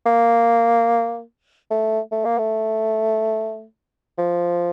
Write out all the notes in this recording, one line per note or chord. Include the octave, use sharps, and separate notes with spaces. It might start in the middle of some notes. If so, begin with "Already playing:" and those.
A#3
A3
A3
A#3
A3
F3